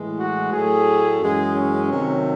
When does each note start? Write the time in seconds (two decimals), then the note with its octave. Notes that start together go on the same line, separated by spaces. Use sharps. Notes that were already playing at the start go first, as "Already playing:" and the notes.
Already playing: A2 E3 G#3
0.17 F#4
0.51 A2 F#3 A3 G#4
1.20 F#2 E3 G#3 G#4
1.55 C#4
1.90 C3 D#3 F#3 A3